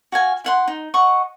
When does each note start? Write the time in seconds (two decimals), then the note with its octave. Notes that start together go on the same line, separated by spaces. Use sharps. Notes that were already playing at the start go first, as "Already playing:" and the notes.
0.12 F#4 F5 G#5
0.44 E4 F#5 C6
0.67 D#4
0.94 D#5 F#5 C#6